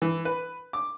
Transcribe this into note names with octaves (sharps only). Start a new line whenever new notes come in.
E3
B4
D6